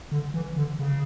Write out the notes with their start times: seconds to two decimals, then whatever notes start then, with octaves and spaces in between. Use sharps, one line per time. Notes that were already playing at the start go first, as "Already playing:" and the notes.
0.12 D3
0.34 E3
0.56 D3
0.79 C#3